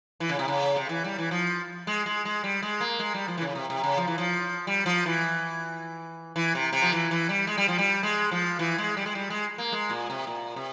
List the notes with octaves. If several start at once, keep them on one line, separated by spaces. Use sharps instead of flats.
E3
C#3
C3
C#3
C3
E3
G3
E3
F3
G#3
G#3
G#3
G3
G#3
A#3
G#3
G3
F3
E3
C#3
C3
C3
C#3
F3
E3
F3
G3
F3
E3
E3
C3
C3
F3
E3
E3
G3
G#3
G3
F3
G3
G#3
F3
E3
G#3
G3
G#3
G3
G#3
A#3
G#3
A#2
C3
A#2
C3